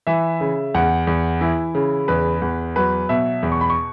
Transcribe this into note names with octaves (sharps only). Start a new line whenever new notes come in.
E3 E5
C#3
E2 F#5
E2
E3 E4
C#3
E2 B4
E2
F#3 B4
B2 E5
E2
C#6
B5
C#6